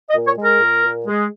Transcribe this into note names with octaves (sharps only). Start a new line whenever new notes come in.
D#5
A#2
C#5
G#3
A#4
A#2
A#2
G#3